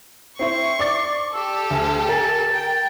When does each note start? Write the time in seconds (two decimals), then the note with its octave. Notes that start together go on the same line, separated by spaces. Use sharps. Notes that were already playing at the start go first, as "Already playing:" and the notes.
0.39 C4 E4 C5 C#6 C7
0.79 D5 D6 A6
1.33 G4 A4 E6
1.71 D2 G#5
2.09 A#4 G#5 A6
2.54 G5